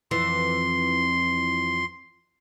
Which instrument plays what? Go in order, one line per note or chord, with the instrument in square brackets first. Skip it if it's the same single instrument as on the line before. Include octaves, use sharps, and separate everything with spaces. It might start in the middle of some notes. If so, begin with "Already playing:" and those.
[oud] F2 E3 [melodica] C6